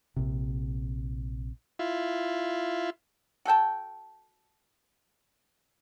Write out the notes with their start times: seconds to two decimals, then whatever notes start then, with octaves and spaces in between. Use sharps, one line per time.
0.16 A#1 C3
1.79 E4 F4
3.45 F#4 A4 G5 A5